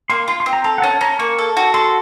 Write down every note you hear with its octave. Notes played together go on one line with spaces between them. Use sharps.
A#3 C6
F4 C6
C6
C4
A#5
A4 A#5
F#5
C#4 A5
C#4 A#5
A#3 C#6
A4
F#4
A4 C6